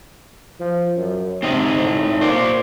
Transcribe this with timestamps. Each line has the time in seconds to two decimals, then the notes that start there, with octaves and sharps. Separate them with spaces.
0.60 F3
0.96 F#2
1.43 C3 C4 D#4 D#5
1.80 A2
2.21 A#2 C5 D5